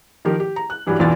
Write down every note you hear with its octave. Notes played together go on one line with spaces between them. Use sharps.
D#3 F3 G4 A#4
G4
A#5
F#6
G2 E3 F#3 G3
B1 E2 E3 D4 F4 A6